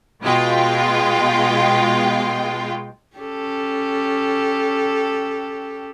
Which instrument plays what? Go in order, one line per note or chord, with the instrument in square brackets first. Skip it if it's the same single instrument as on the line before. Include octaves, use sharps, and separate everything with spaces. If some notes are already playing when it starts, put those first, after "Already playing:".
[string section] B2 G#3 F4 G5
[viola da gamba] C#4 G4 A4